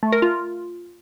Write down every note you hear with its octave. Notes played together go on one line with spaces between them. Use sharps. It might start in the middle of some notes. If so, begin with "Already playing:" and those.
A3
A#4
F4